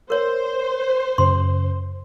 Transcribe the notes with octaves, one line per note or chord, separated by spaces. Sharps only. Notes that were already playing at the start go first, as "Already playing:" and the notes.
A#4 C5 C#5
F#2 C#3 C6